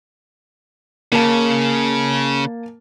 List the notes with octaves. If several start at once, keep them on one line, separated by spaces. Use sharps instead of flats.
C#3 A#3 A5